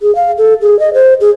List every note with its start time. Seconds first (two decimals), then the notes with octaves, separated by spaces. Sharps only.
0.01 G#4
0.15 F5
0.38 A4
0.61 G#4
0.79 D#5
0.94 C5
1.21 G#4